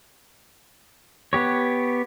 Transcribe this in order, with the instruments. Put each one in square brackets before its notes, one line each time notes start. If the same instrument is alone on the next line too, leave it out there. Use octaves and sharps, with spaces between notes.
[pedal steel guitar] B3 G4 C#5